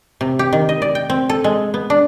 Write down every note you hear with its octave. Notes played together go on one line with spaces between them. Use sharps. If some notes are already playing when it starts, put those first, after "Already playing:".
C3
G4
D#3
D#5
D5
G5
C4
A4
G#3
B3
D4